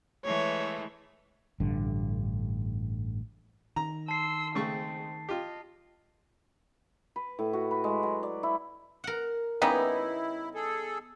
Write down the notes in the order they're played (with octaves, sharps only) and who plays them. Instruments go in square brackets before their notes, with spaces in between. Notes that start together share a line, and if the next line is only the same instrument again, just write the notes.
[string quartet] E3 G#3 A3 [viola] C#5
[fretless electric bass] A1 G2 D3
[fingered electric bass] D#3 [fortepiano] A#5
[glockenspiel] A5 C7 [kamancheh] C6 E6
[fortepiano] C#3 A3 C#6 [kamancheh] G#3 C4
[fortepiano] F4 G4 [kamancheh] D#5
[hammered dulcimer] B4
A2
F#4
B4
G#3
F#3
D5
E4
[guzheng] A#4 F#5
[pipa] C#3 G3 D#4 [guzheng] B3 [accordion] E4
[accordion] G#4 A4